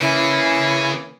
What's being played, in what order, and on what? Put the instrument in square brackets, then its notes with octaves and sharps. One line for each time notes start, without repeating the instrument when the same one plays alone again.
[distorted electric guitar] C#3 G#4 [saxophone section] E3 A#3 C#4 [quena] E4